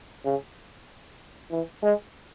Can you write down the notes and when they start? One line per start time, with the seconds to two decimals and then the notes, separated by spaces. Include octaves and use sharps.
0.25 C#3
1.51 E3
1.83 G#3